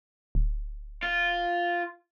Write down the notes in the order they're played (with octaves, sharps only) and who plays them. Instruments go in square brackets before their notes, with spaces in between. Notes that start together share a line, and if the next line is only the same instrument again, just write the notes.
[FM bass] D1
[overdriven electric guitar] F4